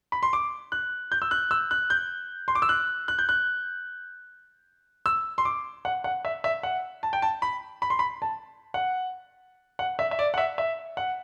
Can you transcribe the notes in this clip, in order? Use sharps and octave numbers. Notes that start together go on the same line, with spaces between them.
B5
C6
D6
F#6
G6
E6
F#6
E6
F#6
G6
C6
D6
E6
F#6
F#6
G6
F#6
E6
C6
D6
F#5
F#5
E5
E5
F#5
A5
G5
A5
B5
B5
C6
B5
A5
F#5
F#5
E5
E5
D5
F#5
E5
E5
F#5